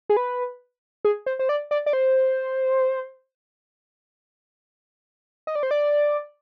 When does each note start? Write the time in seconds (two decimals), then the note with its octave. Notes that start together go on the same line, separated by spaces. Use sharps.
0.09 G#4
0.17 B4
1.05 G#4
1.26 C5
1.39 C5
1.49 D5
1.71 D5
1.86 D5
1.93 C5
5.47 D#5
5.55 D5
5.63 C5
5.71 D5